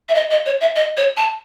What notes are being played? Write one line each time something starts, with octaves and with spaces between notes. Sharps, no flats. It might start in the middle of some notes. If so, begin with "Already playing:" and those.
E5
D#5
D#5
C#5
E5
D#5
C#5
A5